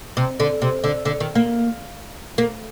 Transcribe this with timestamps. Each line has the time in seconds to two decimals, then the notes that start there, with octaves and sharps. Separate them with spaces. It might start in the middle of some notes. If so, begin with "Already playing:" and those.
0.17 C3
0.40 D3
0.62 C3
0.84 D3
1.05 D3
1.20 D#3
1.35 A#3
2.38 A#3